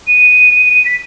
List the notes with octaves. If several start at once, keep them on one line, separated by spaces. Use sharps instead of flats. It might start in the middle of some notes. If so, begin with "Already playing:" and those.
D#7
B6